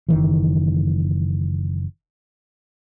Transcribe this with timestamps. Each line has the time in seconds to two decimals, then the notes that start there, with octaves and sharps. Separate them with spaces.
0.09 F#1 D#3 E3